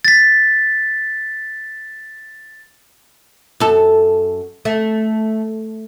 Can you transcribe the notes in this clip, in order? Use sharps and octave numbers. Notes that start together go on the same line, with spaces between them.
A6 B6
F#2 A4
A3